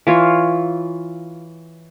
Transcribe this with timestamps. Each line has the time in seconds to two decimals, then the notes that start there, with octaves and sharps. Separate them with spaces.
0.07 E3 F4 C#5